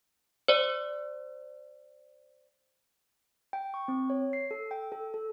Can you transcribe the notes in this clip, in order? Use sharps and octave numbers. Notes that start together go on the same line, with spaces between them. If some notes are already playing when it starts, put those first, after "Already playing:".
C5 D5
G5
C#6
C4
C#5
C7
A4
G5
A4
A4